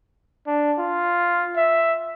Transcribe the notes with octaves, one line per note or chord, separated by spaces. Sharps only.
D4
F4
E5